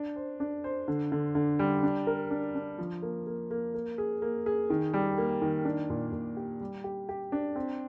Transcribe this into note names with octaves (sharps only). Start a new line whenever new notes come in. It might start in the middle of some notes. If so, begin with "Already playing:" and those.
Already playing: D4
C5
D4
C5
D3
D3
D3
G3
D4
A#4
D4
D4
F3
A#3
A#3
A#3
A#3
G#4
A#3
G#4
D#3
G3
A#3
D#3
D4
A#2
A#2
G4
G3
G4
G4
D4
C4